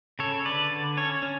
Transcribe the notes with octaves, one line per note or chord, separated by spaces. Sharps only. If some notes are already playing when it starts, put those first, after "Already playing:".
C#3 A4 C#5
D3 B4 D5
D3
C#4 A4 C#5
C#4